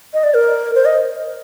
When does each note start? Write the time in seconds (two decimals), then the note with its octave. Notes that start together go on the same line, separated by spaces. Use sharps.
0.14 D#5
0.24 D5
0.34 A#4
0.75 C5
0.85 D#5